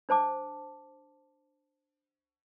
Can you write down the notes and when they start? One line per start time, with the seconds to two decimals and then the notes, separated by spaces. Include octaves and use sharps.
0.09 D4 C5 A5 D6